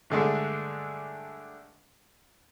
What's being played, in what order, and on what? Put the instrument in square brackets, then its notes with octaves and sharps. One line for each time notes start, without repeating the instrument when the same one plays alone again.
[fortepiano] G2 D3 G#3 A3